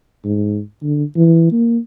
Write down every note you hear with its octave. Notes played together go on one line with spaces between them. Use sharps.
G#2
D3
E3
A#3